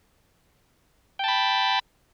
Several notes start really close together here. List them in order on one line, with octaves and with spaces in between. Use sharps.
G5 A5 B5